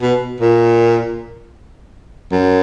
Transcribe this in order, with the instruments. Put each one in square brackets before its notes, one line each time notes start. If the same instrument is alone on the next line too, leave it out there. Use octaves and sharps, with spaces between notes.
[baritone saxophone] B2
A#2
F#2